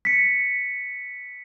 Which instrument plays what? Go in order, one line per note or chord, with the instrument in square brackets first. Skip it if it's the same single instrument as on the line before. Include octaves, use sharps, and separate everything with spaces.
[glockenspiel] B6 C#7